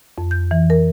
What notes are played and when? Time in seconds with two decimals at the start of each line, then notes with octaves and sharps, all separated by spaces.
0.18 F2
0.31 G6
0.51 E3
0.70 A#4